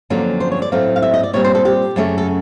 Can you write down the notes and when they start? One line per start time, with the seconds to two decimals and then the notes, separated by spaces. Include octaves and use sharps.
0.10 F2 D3 F#3 A#3 C#4
0.40 C5
0.52 C#5
0.62 D5
0.72 A2 F#3 A3 C4 F5
0.96 F5
1.02 E5
1.14 D#5
1.23 D5
1.33 A#2 G3 C4 C#5
1.44 C5
1.55 A4
1.65 G4
1.96 F#2 C#3 F#3 A3 C#4
2.18 A4